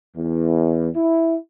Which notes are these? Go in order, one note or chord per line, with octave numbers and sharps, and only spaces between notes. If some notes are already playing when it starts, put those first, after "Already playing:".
E2
E4